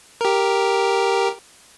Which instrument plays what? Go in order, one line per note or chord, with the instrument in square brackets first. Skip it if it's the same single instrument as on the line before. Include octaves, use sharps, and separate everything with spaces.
[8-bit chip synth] G4 A#4